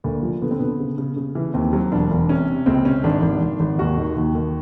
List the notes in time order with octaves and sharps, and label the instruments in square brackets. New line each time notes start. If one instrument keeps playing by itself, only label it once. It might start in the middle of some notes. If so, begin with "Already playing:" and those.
[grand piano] D2 A#3
F3
D3 B3
C4
D3 B3
C#3
C#3
C#3
E3
D#2 C4
F#3
E1 D4
E1
C3 C#4
C3
C#2 C4
C3 C#4
G#1 D4
G#1
G#1
G#1
D#2 F#4
D#3
D#2
D#3